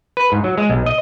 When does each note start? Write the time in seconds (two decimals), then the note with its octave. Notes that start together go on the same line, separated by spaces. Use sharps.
0.17 B4
0.32 G#2
0.44 F#3
0.58 G#3
0.70 B1
0.86 D#5